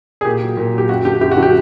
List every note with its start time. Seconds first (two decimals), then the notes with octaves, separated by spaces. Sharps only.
0.21 G#4
0.25 A#2 G4
0.42 F#3
0.57 A#2
0.74 F#3 G4
0.89 F#2 F#4
1.05 D3 F#3 G4
1.21 F#2 G4
1.31 F#4
1.37 D3 F#3
1.43 G4